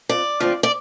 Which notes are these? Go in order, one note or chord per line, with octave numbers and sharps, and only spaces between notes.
F2 D5
D3 F3 A3 C4
D5